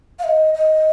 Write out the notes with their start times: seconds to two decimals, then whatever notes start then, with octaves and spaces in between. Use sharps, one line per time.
0.19 F5
0.24 D#5
0.55 D#5